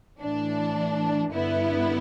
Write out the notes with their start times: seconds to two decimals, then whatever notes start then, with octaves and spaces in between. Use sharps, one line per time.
0.20 A2 E3 D4
1.33 G2 D3 B3 E4